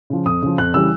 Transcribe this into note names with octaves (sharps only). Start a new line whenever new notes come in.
C#3 F3
F2 D#6
C#3 F3
F2 F#6
C#3 E3 G3 E6